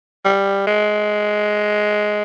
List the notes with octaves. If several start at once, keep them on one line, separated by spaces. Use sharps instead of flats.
G3
G#3